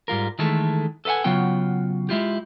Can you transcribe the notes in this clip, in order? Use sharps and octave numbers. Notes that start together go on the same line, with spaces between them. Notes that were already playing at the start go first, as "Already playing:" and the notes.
G#2 G3 F4 A#4
D#3 E3 G#3 A3 A4
A4 B4 F5 F#5 G#5
C#3 F#3 B3 F4 F#5 G5
G#3 E4 F4 G4